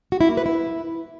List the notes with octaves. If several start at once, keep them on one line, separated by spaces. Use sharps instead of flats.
F#4
E4
A#3
B4
E4